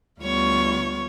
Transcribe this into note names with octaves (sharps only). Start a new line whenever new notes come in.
D2 G3 B3 F4 C#5 C#6